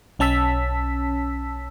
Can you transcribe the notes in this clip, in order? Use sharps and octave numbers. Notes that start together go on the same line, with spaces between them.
B1 C#4 A5 E6 B6